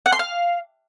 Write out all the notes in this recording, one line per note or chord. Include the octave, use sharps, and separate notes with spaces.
F#5
C6
F5